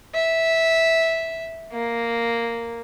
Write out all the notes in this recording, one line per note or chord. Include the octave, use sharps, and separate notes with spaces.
E5
A#3